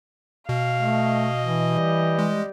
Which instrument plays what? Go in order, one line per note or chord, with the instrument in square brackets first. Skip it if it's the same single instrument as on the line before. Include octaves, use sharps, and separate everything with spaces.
[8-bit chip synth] B2 [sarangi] F5
[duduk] A3 [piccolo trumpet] D#5
[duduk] E3
[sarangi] G3
[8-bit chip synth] G#3